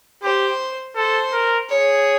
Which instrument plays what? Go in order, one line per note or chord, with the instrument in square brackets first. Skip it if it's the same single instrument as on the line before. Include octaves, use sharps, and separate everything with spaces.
[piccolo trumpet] G4 [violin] C5
[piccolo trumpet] A4 [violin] C5
[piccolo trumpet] A#4
[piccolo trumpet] G#4 [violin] C#5